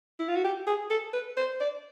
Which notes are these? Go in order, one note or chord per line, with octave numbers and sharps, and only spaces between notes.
E4
F4
F#4
G4
G#4
A4
B4
C5
D5